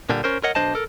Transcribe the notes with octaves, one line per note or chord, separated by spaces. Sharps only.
A#2 D3 G3
C#4 A#4 C5
A#4 C#5 D#5 F#5
B1 D4 C5 D#5 A5
A4 A#4